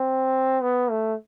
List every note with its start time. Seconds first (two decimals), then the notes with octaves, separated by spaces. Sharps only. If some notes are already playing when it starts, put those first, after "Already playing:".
Already playing: C4
0.62 B3
0.90 A3